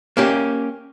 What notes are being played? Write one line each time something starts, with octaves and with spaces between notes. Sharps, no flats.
A#3 C#4 G4